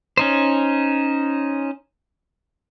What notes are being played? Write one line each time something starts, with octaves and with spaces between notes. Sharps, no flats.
C#4 D#4 C5